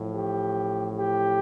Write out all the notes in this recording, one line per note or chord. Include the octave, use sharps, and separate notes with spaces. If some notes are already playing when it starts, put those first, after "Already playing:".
Already playing: A1 A2 F3
G4
G4